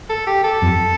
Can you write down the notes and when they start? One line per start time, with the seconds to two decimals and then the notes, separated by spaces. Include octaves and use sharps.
0.10 A4
0.27 G4
0.44 A4
0.62 F2